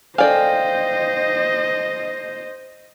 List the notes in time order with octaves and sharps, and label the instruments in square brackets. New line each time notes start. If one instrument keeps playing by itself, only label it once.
[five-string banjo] A4 D5 G#5 [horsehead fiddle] C5 D#5 [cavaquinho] F5 G5